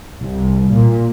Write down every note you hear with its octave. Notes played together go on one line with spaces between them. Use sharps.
C2
A#2